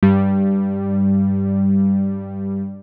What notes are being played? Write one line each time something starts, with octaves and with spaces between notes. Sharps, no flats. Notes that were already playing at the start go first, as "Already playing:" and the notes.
G2 G3